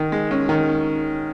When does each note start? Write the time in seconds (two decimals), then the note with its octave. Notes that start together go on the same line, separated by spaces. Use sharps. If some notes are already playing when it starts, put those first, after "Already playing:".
Already playing: D#3
0.12 G#3
0.31 C#4
0.49 D#3